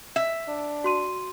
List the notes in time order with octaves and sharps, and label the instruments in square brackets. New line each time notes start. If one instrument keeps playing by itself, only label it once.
[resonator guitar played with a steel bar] E5
[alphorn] D4
[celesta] F#4 C6 D#7